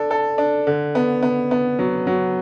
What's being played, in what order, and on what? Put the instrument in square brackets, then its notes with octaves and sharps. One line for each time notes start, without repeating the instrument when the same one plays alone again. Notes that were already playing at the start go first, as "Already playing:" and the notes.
Already playing: [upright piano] D4 A4
A4
D4
D3
B3
B3
B3
F#3
F#3